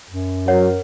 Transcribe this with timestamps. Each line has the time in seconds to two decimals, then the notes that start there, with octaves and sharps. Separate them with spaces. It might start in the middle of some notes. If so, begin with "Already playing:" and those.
0.11 F#2
0.48 F#3 A#4 C#5 F#5